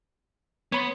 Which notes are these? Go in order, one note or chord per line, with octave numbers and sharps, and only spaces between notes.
B3 C#5 B5 C6